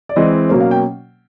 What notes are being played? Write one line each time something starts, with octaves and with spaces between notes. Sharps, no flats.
D5
E3 G#3 C4 D#5
B2 F#3 A#3 C#4 C5
F5
G5